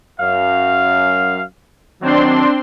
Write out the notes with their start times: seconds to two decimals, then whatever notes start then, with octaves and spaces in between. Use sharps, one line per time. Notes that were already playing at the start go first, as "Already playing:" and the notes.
0.20 F#2 F5
2.02 D#3 F#3 C4 D4 C6